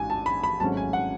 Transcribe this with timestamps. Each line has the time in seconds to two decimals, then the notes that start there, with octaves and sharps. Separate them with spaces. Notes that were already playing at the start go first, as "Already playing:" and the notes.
Already playing: A1 G#2 G#5
0.10 A5
0.26 B5
0.44 B5
0.60 G#1 G#2 F#3 A3 C#4 A5
0.77 G#5
0.93 F#5